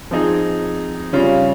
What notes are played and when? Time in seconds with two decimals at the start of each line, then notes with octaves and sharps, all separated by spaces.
0.11 F3 C4 D#4 G#4
1.13 C#3 G3 C#4 F4